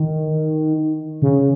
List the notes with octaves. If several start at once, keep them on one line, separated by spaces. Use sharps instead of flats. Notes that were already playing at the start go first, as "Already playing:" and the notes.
Already playing: D#3
C#3